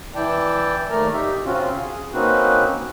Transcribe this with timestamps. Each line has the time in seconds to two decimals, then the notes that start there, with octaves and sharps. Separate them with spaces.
0.15 E3 E4 D5 G5 A5
0.90 D#2 A3 A#4 D5 A#5
1.13 D#4 G4 E5
1.45 C#3 C4 C#4 F4 F#4
1.72 G#4
2.13 A#3 C4 C#4 D#4 F#4 B4